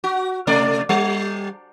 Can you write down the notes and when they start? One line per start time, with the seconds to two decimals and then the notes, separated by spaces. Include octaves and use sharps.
0.04 F#4
0.47 C3 A3 D5
0.89 G3